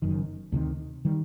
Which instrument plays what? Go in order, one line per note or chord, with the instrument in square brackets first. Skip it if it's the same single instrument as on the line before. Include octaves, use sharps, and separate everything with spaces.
[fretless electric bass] F#1 F#2 D#3
D2 C3 D#3
D#3 G3